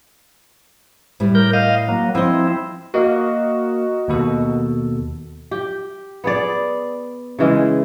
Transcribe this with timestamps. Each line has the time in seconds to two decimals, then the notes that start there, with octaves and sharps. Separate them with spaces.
1.20 A2 G3 E4
1.35 A#4 G6
1.53 D#5 F5
1.88 F#3 A#3
2.15 F3 C4 E4 D#5
2.94 A#3 F#4 A#4 D#5
4.08 D#2 B2 A4
5.51 G4
6.24 B3 G#4 D5
7.39 C#3 E3 G#3